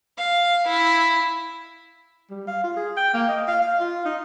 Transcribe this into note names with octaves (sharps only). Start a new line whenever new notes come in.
F5
E4
G3
F5
F4
G#4
G5
A#3
D#5
F5
F5
F4
D#4